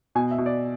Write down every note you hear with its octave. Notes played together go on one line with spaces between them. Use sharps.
B2 G#5
E5
B2
D5